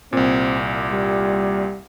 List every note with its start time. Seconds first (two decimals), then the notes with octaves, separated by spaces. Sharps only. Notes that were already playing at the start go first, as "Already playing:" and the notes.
0.13 C2 A#2 C4
0.92 G3